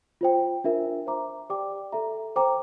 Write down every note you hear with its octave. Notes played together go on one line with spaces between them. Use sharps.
F4 C5 G5
D4 F4 A#4 E5
C5 E5 A#5 D6
G4 D5 G5 D6
A4 E5 A#5
C5 G5 A#5 D6